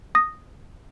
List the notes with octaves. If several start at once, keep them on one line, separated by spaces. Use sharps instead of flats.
D#6 A#6